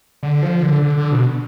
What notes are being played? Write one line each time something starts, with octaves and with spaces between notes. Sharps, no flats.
D3
F3
D3
D3
D3
B2